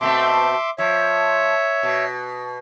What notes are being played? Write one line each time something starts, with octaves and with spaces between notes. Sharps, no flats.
B2 A3 C4 E5 C6 D6
F3 C#5 E5
B2